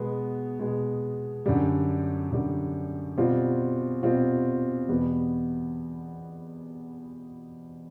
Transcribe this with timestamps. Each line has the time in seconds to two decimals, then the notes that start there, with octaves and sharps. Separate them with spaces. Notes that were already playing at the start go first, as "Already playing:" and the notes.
Already playing: B2 G#3 B3
0.59 B2 G#3 B3
1.46 F#2 D3 G3
2.31 F#2 D3 G3
3.17 B2 G3 C4 F4
4.03 B2 G3 C4 F4
4.88 E2 B2 G3 B3